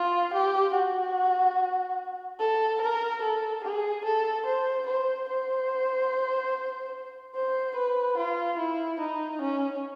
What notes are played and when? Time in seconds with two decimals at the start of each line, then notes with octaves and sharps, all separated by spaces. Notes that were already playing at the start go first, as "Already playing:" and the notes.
Already playing: F4
0.33 G4
0.74 F#4
2.39 A4
2.81 A#4
3.22 A4
3.63 G#4
4.05 A4
4.45 C5
4.87 C5
5.28 C5
7.35 C5
7.76 B4
8.17 F4
8.58 E4
9.00 D#4
9.41 C#4